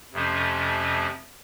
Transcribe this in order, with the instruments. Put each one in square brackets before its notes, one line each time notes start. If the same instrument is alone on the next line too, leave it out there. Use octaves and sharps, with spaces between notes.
[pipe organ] F2 C3 F3 A3 C#4